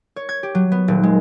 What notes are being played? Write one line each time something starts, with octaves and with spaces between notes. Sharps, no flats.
C#5
G#6
G4
F#3
B3
D#1
G#3